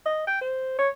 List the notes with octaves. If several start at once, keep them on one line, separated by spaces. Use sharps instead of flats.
D#5
G5
C5
C#5